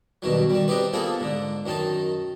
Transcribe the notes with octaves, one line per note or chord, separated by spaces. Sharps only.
G2 B2 D#3 F#3
D#3 G3
C4 D4 D#4 G4 B4
F3 A#3 B3 G#4 A4
G#2 D3
F#2 D#3 D#4 A5